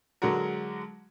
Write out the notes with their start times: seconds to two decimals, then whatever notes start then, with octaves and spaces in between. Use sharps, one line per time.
0.22 D3 F#3 G#3 F#4 A#4